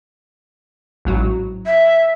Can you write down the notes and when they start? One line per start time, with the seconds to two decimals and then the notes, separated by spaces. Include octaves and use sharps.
1.05 A1 G#2 F#3
1.66 E5